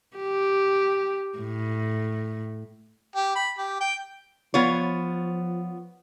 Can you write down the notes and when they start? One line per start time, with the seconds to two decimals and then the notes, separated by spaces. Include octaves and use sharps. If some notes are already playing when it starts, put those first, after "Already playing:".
0.17 G4
1.38 A2
3.16 G4
3.36 B5
3.58 G4
3.81 G5
4.54 F3 B3 F4 C#5